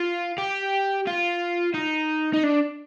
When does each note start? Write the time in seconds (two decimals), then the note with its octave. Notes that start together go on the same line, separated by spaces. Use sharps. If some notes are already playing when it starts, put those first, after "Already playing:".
Already playing: F4
0.38 G4
1.07 F4
1.74 D#4
2.34 D#4
2.44 D4